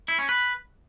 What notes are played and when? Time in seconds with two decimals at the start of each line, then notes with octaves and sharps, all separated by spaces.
0.08 E4
0.19 C#4
0.29 B4